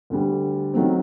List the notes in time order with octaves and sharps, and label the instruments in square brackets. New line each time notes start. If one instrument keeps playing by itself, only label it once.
[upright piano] D2 D3 G3
D#3 F#3 A3 C4